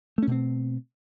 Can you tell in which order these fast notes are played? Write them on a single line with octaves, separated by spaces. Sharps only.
A3 C#4 B2 C4